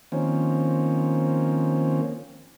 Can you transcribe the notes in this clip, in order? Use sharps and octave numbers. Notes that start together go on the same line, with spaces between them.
D#3 F3 A#3 C4 C#4